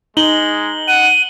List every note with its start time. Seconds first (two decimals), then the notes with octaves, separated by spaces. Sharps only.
0.17 G#3 D#4 F#7 G7
0.88 F#5 D#7